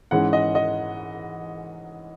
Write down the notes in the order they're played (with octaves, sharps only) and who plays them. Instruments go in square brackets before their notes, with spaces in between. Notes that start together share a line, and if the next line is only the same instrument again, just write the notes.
[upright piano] G#2 E3 G#3 C#4 F#5
D#5
D#5